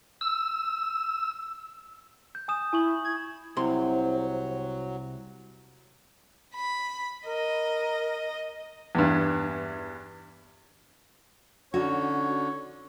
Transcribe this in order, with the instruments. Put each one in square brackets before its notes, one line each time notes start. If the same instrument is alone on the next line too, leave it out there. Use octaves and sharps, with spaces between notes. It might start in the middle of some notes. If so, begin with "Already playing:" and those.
[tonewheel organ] E6
[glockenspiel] G6
G#5 D#6 E7
[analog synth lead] E4 [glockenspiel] G#5 C#6 F#7
[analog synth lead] G#6
[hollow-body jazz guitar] C2 C3 C6 [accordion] F#3 [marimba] E4 [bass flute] C5
[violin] B5
[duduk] A#4 [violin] D#5
[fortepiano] E2 G2
[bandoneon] D3 [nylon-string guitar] C#4 D#4 F#4 [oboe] C#5